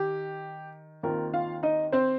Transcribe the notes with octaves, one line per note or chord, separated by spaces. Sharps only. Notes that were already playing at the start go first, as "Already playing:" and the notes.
Already playing: D#3 G4
D#2 D#3 C4 F4 A#4
F4 F5
D#4 D#5
C4 C5